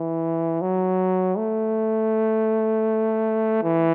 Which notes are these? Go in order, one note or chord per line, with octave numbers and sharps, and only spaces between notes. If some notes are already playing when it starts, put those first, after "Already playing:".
Already playing: E3
F#3
A3
E3